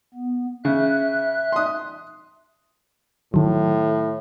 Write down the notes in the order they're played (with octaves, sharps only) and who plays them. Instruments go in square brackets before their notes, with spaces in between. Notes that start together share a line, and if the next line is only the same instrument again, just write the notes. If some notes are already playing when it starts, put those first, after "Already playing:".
[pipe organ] B3
[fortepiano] C#3 [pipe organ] E5 F#6
[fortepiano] C6 D#6
[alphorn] A2 [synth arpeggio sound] D#3 F#3